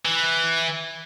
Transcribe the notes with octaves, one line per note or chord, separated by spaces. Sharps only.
E3